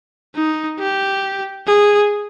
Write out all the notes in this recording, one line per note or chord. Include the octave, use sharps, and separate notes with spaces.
D#4
G4
G#4